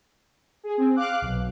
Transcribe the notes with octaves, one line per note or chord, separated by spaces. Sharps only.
G#4
C4
F5 D6 F#6
B1